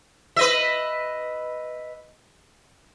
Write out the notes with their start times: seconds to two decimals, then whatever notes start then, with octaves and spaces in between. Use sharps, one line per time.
0.36 B4 D#5 E5